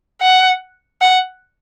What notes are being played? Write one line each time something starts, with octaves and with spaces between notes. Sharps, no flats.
F#5
F#5